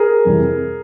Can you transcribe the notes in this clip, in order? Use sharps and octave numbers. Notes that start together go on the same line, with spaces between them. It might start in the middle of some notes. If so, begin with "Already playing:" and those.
Already playing: G#4 A#4
F2 C3 E3 G3